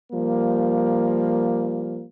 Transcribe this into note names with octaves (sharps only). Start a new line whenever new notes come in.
F3 G3 A#3